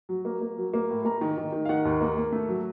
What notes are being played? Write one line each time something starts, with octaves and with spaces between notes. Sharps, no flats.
F#3
A#3
A#3
F#3
A#3
A2
A#3 A#5
D#3
D#3
D#3
F5
D#3 F#5
D#2
A#3
A#3
A3
F#3